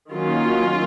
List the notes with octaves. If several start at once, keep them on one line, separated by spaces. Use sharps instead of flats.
D#3 F#3 A#3 C#4 F4